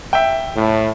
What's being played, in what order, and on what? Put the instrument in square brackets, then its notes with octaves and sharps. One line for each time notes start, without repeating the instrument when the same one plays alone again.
[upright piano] E5 G5
[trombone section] A2